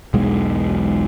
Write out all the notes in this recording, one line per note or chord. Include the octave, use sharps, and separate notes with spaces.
E1 B1 E2 G#3